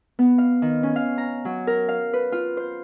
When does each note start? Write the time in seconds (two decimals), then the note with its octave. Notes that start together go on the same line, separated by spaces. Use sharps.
0.19 B3
0.38 F5
0.62 D#3
0.83 C#4
0.96 F5
1.18 A#5
1.45 F#3
1.67 A#4
1.88 F5
2.13 B4
2.32 F4
2.57 C5